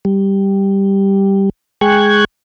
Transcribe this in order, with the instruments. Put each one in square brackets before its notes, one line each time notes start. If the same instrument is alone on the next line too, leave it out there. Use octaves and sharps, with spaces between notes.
[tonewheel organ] G3
G#3 G#4 G5 C#6 F#6 G#6